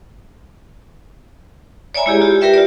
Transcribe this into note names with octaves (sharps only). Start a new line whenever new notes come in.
C#5 D5 E5 G#5 A#5 B5
G#3 E4 G4 G#4
F4 G4
G4 A#4 B4 D5 E5 G5
F4 D5